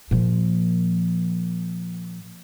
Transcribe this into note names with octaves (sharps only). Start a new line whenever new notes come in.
A#2 F3